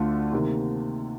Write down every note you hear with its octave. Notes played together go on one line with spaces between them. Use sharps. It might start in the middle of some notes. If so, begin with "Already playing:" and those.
Already playing: D2 D3 A3 D4 F4
C3 D#3 A#3